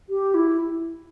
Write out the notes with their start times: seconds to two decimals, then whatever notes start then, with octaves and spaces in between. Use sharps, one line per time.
0.09 G4
0.35 E4